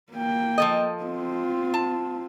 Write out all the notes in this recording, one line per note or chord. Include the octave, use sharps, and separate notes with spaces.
A#3 G5
F3 A4 D#5
C4 F4
A5